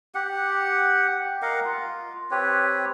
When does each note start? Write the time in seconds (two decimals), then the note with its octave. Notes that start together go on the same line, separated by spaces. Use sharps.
0.15 G4 F#5
1.42 A#4 D#5 F5 F#5
1.65 F4
2.31 C4 G4 B4 C#5